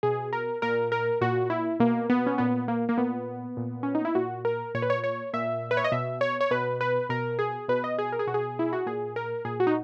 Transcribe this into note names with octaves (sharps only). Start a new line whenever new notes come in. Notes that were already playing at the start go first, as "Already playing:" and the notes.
B2 G#4
A#4
A#2 A#4
A#4
A#2 F#4
E4
B2 A#3
B3
C#4
A#2 B3
A#3
A#3
A#2 B3
A#2
C#4
D#4
E4
A#2 F#4
A#4
A#2 C#5
B4
C#5
C#5
A#2 E5
B4
C#5
D#5
B2 E5
C#5
C#5
B2 B4
B4
B2 A#4
G#4
B2 B4
D#5
G#4
A#4
G#4
B2 F#4
G#4
E4
F#4
A#2 G#4
A#4
A#2 G#4
F#4
D#4